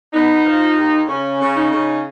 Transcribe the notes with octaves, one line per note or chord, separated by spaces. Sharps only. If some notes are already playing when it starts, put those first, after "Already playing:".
B3 D#4
F3
D#2
C#3 C#4
C#3
D#4
C#3